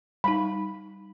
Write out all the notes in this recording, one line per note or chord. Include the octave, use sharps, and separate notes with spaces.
G3 D#4 B5